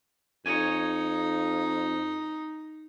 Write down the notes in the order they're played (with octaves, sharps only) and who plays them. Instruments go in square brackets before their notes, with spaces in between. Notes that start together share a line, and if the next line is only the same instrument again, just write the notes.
[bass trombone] F2 [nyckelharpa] D#4 [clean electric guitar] C#5 G#5